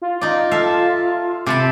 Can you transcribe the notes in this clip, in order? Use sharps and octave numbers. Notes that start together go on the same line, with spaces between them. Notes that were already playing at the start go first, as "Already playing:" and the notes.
F4
D#4 D5
A4 E5 F5
C3 A5 B5 D6